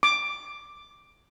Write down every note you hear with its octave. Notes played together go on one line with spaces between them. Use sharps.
D6